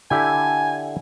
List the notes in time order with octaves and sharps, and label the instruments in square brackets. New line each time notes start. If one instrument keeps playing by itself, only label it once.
[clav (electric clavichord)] D3 E4 G4 [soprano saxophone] G#5